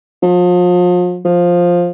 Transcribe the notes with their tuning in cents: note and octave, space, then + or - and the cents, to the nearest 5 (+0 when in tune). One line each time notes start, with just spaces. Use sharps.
F3 +35
F3 +5